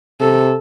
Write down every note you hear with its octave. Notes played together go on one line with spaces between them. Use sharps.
C3 A4